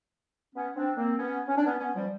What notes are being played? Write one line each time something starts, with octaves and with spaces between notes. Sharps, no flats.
B3 C#4
C4 D4
A#3 C4
B3 C#4
C#4
D4
B3 C#4
B3 C#4
F3 G3